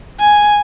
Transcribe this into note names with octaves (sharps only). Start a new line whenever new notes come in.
G#5